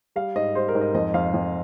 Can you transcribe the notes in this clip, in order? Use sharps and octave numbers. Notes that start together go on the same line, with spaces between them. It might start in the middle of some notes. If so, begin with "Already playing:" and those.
G3 F5
G#2 D#5
G3 C5
A#4
G#2
D#5
F2 D#5
F2 F5
F2